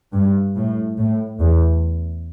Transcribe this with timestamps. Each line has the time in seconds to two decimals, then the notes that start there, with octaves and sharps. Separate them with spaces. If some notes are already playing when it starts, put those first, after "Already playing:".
0.13 G2
0.55 A2
0.97 A2
1.40 E2